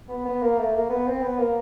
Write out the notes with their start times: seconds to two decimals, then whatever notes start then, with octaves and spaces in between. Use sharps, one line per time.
0.09 B3
0.25 B3
0.42 A#3
0.58 A3
0.75 A#3
0.90 B3
1.07 C4
1.22 B3
1.38 A#3